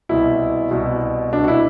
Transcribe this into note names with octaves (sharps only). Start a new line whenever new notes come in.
C2 B2 E4
C2 B2
C2 B2 D4
F#4
E4